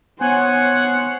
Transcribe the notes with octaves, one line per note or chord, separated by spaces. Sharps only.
B3 C5 C#5 F#5 G#5